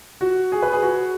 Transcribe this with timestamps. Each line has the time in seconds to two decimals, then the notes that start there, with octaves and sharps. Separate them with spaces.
0.21 F#4
0.52 G#4
0.62 B4
0.73 G#4
0.83 F#4